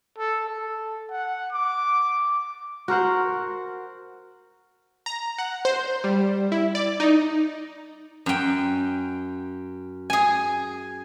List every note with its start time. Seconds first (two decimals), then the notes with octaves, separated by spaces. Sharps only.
0.18 A4
0.49 A4
1.10 F#5
1.53 D6
2.88 F#4 A#4 C5 F#5
5.06 A#5
5.38 F#5
5.65 C5
6.04 G3
6.52 E4
6.75 D5
7.00 D#4
8.26 F#2 G5
10.10 G#4 G#5